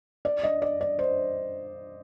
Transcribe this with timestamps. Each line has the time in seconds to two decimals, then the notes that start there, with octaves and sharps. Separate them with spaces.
0.25 D5
0.43 D#5
0.62 D5
0.81 D5
0.99 C5